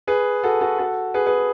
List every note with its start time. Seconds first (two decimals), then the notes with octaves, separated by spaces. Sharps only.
0.07 G#4 B4
0.43 F#4 A4
0.61 F#4 A4
0.79 F#4 A4
1.14 G#4 B4
1.26 G#4 B4